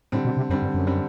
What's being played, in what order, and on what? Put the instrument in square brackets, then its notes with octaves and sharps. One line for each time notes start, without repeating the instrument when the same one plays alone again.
[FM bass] A2 [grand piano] D3 G3 C4
[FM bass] B2
C3
[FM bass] F#2 [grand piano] D3 G3 C4
[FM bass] G2
F#2
[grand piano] D3 G3 C4